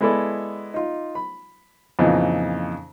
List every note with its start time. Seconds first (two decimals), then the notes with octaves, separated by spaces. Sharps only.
0.01 G#3 B3 E4 G#4 A4 D5
0.74 D#4 F4
1.15 B5
1.99 F2 A#2 C#3 E3 D#4